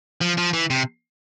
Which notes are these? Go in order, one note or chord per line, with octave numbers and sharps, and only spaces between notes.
F3
F3
E3
C3